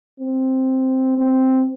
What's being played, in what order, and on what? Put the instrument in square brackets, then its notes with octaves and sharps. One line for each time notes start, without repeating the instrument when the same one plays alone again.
[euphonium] C4
C4